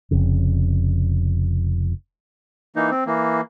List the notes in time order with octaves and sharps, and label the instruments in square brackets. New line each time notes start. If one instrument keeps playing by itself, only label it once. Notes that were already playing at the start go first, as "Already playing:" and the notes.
[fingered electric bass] F1 F2 C#3
[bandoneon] E3 A#3 D#4
C4
E3 A#3